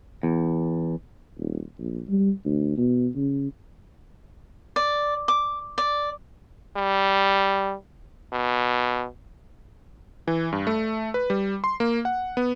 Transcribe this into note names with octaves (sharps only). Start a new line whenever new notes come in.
E2
D#1
A#1
G3
D2
B2
C#3
D5
D6
D5
G3
B2
E3
G2
A3
B4
G3
C6
A#3
F#5
B3